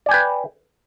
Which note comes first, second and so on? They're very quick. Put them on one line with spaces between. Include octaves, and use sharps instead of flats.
D5 G#5 G5 B4